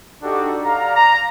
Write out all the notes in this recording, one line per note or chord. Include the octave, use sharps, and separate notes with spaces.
D4 D#4 F#4 G4 A4
D5 F5 A#5
A#5